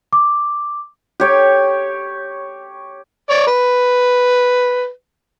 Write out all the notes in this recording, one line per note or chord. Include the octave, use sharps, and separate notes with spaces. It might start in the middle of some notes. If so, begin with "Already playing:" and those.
D6
G4 C#5 G5
C#5 D5
B4